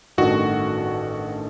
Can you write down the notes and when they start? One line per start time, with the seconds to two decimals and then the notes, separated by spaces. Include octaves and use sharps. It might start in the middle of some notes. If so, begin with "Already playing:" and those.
0.18 A1 G2 D#3 A3 F#4